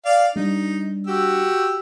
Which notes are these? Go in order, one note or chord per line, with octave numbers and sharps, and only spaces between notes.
D5 F5
G3 D4 D#4
F#4 G4 E6